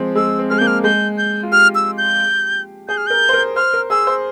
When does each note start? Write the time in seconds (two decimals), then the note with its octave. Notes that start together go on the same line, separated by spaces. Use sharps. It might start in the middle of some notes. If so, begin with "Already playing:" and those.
Already playing: F3 G#3 C4
0.15 G#3 E6
0.39 C4
0.50 G#3 F6
0.58 A#3 G6
0.67 F6
0.84 G#3 G6
1.18 G6
1.43 F4
1.52 G4 F6
1.75 E6
1.98 G6
2.88 G#4 G6
2.97 F6
3.07 A#4 G6
3.29 C5
3.33 A#4
3.56 C5 F6
3.74 A#4
3.90 G#4 E6
4.07 C5